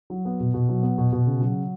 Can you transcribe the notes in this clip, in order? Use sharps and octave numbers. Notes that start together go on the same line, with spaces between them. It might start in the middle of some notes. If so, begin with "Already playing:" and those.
F#3
B3
B2
B2
F#3
B3
B2
B2
C#3
F#3